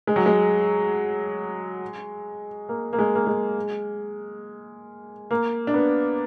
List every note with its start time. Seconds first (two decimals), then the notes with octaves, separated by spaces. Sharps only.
0.07 G#3
0.16 F#3
0.26 G#3
2.69 A#3
2.93 A#3
2.99 G#3
3.15 A#3
3.27 G#3
5.31 A#3
5.67 D4
5.74 B3